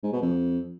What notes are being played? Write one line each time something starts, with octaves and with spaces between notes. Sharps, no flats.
G#2
B2
F2